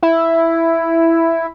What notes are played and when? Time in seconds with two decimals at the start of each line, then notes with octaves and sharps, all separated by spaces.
0.03 E4